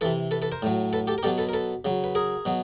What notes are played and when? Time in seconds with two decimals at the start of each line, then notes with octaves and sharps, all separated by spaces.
0.01 C3 E3 A4 B4
0.31 A4 B4
0.42 A4 B4
0.52 A#4 C5
0.62 A2 F#3
0.93 A4 B4
1.07 G4 A4
1.18 A#4
1.23 B2 F#3 G4 A4
1.38 A4 B4
1.49 A#4
1.53 A4 B4
1.85 C#3 F#3
2.04 B4
2.15 G#4 A#4
2.45 B2 F#3